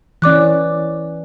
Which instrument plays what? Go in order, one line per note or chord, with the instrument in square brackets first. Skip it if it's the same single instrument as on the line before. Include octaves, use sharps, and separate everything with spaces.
[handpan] E3 C#4 [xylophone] D5 D6 F#6